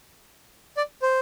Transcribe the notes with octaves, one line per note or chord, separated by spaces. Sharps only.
D5
C5